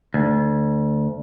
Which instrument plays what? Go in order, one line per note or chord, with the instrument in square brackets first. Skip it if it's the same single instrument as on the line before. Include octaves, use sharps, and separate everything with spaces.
[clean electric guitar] D2